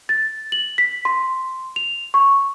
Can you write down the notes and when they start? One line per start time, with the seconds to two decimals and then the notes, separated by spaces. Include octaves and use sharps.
0.09 A6
0.52 F#7
0.78 B6
1.05 C6
1.76 F7
2.14 C#6